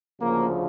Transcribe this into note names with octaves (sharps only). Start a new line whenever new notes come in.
D2 C#3 F3 A#3